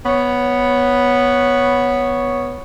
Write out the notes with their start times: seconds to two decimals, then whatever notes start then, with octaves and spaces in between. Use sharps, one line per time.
0.06 B3 C#5